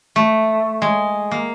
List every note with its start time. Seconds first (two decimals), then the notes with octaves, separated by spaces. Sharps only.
0.16 A3
0.82 G#3
1.31 A#3